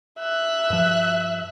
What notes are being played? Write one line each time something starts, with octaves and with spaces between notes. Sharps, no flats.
E5 F#6
G2 F3